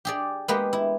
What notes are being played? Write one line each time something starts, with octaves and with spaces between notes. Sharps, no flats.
G4 G#4 D5
G#3 A#3 B3 G4 B4
E4